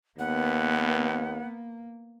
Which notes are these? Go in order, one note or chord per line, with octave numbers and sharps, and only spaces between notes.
D#2 A#3 B3 F#5